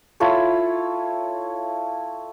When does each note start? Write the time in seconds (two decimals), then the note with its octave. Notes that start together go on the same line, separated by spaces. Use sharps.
0.20 E4 F4 A4 C#5